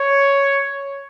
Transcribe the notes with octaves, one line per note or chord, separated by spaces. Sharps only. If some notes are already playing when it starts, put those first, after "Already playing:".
Already playing: C#5